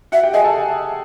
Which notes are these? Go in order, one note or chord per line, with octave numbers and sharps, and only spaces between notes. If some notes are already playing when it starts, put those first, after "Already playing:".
F#4 E5 F#5
G4 G5
G#4 D#5 G#5
A4 A5